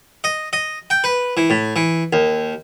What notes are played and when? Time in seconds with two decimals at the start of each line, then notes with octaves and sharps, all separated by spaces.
0.24 D#5
0.53 D#5
0.90 G5
1.04 B4
1.37 E3
1.50 A2
1.76 E3
2.13 D#2